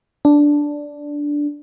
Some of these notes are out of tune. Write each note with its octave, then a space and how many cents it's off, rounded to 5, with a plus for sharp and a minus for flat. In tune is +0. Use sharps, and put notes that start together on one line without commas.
D4 -5